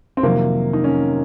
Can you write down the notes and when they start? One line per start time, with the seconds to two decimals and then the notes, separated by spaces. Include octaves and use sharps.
0.17 C4
0.23 F2 C3 D#3 F#3 A#3
0.73 D#4
0.84 C#4